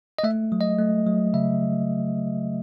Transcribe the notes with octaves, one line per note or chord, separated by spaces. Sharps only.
D#5
A3 E5
F#3
D#5
A3
F#3
C#3 E5